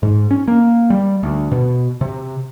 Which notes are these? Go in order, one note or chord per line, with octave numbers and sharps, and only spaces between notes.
G#2
C#4
A#3
G3
D2
B2
C3